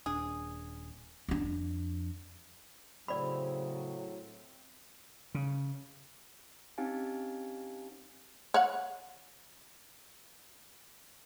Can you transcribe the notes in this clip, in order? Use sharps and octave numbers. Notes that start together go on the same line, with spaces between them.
D#1 D4 G#4
F2 D4
A2 C#3 F#3 C4 D5 E5 B5
C#3
C4 C#4 D#4 G4 F5 G#5
C#5 F5 F#5